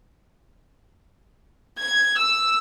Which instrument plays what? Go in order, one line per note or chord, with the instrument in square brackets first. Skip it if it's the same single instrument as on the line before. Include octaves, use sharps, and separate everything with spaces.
[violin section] G#6
E6